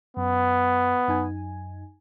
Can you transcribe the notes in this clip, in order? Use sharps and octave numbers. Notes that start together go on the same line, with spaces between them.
F#2 B3
F#2 D#4 G#5